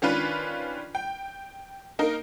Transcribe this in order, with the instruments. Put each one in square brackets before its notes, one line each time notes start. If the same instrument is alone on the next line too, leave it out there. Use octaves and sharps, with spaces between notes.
[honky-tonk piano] D#3 C#4 D4 F4 B4
G5
A#3 D#4 A#4